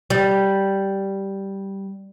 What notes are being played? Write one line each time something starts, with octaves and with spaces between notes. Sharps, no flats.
G3